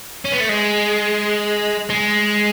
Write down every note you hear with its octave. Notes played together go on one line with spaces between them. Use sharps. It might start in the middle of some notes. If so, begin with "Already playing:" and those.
C#4
B3
A3
G#3
G#3